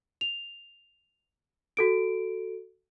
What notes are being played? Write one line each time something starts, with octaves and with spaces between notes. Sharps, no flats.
F7
F#4 A4 D7